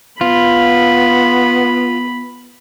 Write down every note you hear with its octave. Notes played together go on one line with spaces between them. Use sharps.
B3 F4 B5